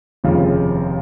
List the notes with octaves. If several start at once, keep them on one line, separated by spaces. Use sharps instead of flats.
F1 D#2 C#3 F3